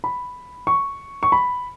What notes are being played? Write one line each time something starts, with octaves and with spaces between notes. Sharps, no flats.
B5
C#6
C#6
B5